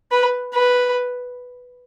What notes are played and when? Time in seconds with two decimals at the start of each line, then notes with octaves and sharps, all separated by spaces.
0.12 B4
0.54 B4